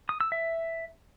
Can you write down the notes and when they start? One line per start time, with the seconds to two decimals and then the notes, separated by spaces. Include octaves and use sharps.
0.09 D#6
0.21 E6
0.32 E5